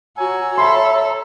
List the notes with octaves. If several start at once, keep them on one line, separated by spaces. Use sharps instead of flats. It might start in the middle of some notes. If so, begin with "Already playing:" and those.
F#4 C#5 G#5 A#5 E6
A4 E5 B5 C6